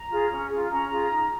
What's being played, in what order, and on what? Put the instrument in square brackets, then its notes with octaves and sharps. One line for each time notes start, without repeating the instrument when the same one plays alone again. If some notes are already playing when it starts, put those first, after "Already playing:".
Already playing: [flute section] A#5
F4 G#4
C#4
F4 G#4
C#4 A#5
F4 G#4
D#4